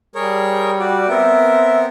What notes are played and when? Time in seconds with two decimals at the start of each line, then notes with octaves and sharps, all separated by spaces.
0.15 G3 G#4 A#4 C#5
0.79 F#4 D5
1.09 B3 C4 A#4 E5